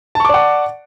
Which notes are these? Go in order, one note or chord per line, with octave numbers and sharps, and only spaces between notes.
D5 F#5 A5 C#6 D6